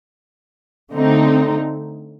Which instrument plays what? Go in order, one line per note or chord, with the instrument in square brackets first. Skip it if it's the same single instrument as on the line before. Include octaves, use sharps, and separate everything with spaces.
[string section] D3 A3 C4 D#4